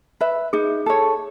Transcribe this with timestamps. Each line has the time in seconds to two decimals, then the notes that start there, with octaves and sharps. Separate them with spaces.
0.21 B4 E5
0.53 D#4 G#4
0.86 A4 C#5